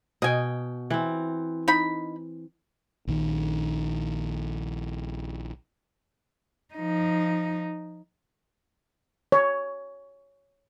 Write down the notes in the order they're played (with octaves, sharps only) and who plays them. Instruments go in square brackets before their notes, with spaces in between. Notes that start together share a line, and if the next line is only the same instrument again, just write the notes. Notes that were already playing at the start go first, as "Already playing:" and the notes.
[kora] B2 G5 [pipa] D#5 G#5
[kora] E3 C4
[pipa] D#4 B5
[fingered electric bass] A#1 D#3
[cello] F3 D#4
[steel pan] C#5